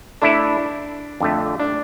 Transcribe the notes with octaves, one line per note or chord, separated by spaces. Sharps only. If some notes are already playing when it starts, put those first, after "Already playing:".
A3 D4 E4 A4
F2 D3 A3
D4